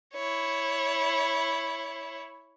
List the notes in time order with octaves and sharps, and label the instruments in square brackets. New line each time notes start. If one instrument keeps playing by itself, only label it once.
[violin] E4 C#5